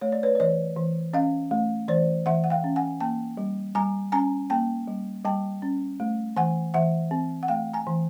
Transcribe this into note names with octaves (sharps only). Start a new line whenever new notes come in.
A3 C#5
D5
B4 C#5
D5
E3 C#5 D#5
E3
C#4 D#5 F5
A3
E3 C5 D5
E3 E5 F#5
F#5
F5 G5
C#4
F#5 G#5
A#3 G5 A5
G3
G3 G#5 A#5
C#4 G#5 A#5
A#3 G5 A5
G3
G3 G5 A5
C#4
A3
E3 F#5 G#5
E3 E5 F#5
C4
F#5
A3 F5 G5
G#5 A#5
E3